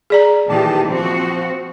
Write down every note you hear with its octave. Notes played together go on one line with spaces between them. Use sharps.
G#4 D5 A#5
A#2 D#3 E3 G4 A5
F3 C4 F#4